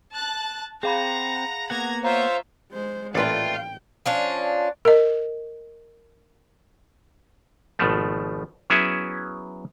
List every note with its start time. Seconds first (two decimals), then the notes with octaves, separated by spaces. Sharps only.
0.15 A5 F#6 A6
0.83 C4 G#4 F5 F#5 A#5 B5
1.70 A#3 B3 F#5 A#5 G#6
2.04 F4 C5 C#5 E5 F5 A#5
2.72 G#3 C5
3.15 A1 A#2 A3 B4 D5 F5 G5 C6
4.06 F3 C#4 D4
4.85 A#4 D#5
7.79 G#1 B2 F3 A3
8.70 F#3 B3 C#4 E4 G#4 E5